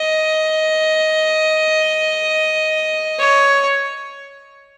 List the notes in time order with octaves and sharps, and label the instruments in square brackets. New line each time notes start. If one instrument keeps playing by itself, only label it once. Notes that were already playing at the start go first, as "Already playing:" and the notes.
Already playing: [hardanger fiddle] D#5
C#5